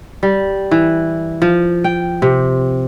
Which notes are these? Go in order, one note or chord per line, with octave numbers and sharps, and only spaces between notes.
G3
E3
F3
G5
C3